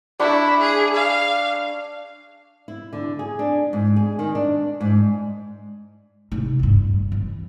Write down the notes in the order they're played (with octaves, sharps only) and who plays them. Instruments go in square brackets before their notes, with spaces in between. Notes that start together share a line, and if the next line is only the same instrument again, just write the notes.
[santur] D4 B5 C#6 [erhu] E4
[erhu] G#4
F5
[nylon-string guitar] E4
D3
G#4
D4
G#2
G#4
D#3
D4
G#2
[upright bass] C3 D#4
A1 G2
E3